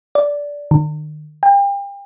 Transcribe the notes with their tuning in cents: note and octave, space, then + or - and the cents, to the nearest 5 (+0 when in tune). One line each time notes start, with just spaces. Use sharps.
D5 -15
D#3 -40
G5 +35